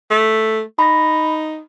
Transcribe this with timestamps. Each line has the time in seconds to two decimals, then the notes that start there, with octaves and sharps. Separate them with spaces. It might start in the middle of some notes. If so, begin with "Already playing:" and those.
0.11 A3
0.79 D#4 B5 A#6